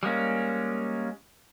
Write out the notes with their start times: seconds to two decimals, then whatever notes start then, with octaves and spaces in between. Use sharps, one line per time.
0.03 G3 G#3 A#3 C#4